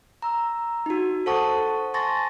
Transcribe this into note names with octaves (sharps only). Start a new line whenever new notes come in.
A#5 E6
D#4 F#4
A4 C5 F#5 A5 C#6 D#6
G#5 A5 C6 C#6 A6 A#6